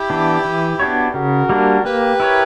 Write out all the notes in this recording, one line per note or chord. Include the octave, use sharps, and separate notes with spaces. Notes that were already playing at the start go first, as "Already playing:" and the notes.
Already playing: E4 G4
E3 B3 D4
E3
B3 D4 F#4 C#5
C#3 F#4 A#4
G3 A#3 D4
A#3 G4 B4
E4 A#4 C#5